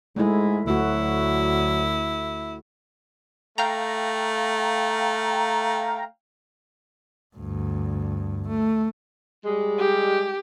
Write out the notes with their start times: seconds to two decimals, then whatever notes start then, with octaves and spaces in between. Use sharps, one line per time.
0.16 G#2 G#3 A3 E4
0.67 D2 F#3 A3 E4 F#4
3.58 A3 F5 G5 A#5
7.36 D2 G2
8.48 A3
9.45 G3 G#3
9.79 G4